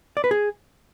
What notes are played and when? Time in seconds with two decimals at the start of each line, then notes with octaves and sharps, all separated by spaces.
0.17 D5
0.24 B4
0.31 G#4